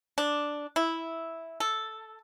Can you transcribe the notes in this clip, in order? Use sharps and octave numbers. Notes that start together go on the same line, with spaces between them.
D4
E4
A4